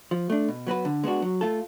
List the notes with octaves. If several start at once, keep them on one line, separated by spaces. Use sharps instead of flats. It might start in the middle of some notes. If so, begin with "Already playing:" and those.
F3
A3 D4
B2
F#3 B3 F#4 B4
D3
G#3 B3 D4 F#4
F#3
A3 F4 A4